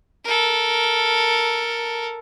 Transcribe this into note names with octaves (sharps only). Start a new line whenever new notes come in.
A4 A#4